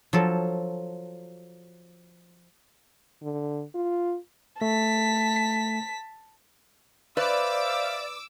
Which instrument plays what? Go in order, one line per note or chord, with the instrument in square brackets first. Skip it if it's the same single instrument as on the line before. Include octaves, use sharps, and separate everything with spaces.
[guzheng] F3 F#3 A4
[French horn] D3
F4
[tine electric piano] A3 [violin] A5 B6
[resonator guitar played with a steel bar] B4 [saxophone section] C5 E5 F5 [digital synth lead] D5 [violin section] D6 E6